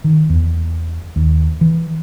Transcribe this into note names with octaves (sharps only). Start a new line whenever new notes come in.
D#3
E2
D#2
E3